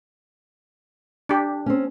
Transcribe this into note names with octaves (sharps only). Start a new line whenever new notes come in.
D4 G4
C4 C#4